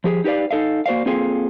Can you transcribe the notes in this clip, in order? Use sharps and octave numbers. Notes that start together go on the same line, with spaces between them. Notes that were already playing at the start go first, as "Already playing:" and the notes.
F3 G4 G#4
D#4 G4 B4 D5 F5
D#4 A4 D#5 F5
A#3 F#4 C5 D5 F5
A#3 C4 F4 G#4 A4 F5